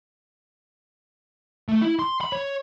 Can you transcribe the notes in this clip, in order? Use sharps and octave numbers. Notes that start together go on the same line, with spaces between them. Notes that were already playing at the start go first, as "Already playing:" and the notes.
A3
E4
C6
B5
C#5